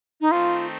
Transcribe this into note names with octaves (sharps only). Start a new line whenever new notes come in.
D#4
D#3 A3 C4 D#4 F4